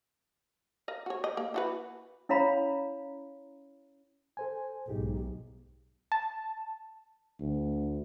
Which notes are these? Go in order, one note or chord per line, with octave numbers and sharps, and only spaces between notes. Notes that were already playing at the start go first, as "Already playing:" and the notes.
A#4 D#5 F5
F#4 C#5
D#5
A#3
E4 F#4 B4
C#4 E4 C#5 F5 A#5 B5
A4 C5 G#5
B1 G#2 D#4 G4 G#4
A5
D2